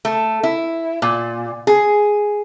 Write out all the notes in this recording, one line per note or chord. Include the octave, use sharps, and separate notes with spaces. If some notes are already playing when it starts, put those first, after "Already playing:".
A3
E4
A#2
G#4